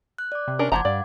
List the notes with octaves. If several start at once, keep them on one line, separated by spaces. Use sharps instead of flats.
F#6
D5 D6
C3
C#4 D4 A#4
F#1 F3 F#5 A5 A#5 D6 G#6
G2 D5 F5